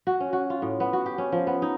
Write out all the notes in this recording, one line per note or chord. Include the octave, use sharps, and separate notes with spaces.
F#4
C#4
F#4
F4
A2
B3
F#4
G4
C#4
F3
B3
D#4